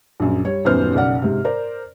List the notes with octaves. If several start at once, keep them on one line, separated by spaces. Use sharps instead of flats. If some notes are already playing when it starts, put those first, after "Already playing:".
A#1 F#2
G3 C#5
D#1 F#2 D#3 B3 C5 F6
F#1 B1 D5 F#5
G#2 C3
A#4 C5 D5